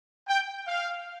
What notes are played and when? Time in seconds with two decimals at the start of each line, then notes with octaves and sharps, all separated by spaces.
0.27 G5
0.66 F5